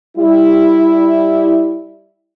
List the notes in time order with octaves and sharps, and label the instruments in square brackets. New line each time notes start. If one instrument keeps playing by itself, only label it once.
[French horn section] G3 E4